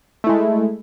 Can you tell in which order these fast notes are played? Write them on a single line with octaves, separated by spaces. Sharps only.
A3 E4 G#3